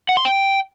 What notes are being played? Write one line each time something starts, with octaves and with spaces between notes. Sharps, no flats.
F#5
C6
G5